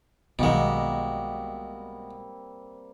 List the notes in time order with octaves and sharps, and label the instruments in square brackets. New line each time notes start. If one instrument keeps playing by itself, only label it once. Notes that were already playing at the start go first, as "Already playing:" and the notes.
[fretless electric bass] B1 D#3 [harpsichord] B2 G#3 [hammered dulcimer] G3 A#3 C4